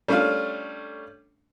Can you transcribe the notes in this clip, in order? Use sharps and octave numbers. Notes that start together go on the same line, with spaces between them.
G3 A3 C#4 D4 F4 F5